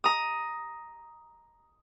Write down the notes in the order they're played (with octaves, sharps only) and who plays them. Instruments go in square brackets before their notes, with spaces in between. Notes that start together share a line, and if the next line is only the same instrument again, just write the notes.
[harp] A#5 D#6